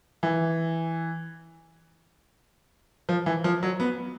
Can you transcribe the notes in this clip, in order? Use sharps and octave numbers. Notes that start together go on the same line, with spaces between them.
E3
F3
E3
F3
F#3
B3